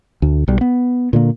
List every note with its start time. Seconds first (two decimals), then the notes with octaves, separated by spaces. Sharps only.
0.22 D2
0.48 B1 G3
0.61 B3
1.13 A#2 D3 A#3